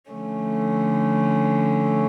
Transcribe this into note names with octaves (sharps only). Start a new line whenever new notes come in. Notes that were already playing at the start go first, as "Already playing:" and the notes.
D3 F3 A3 C#4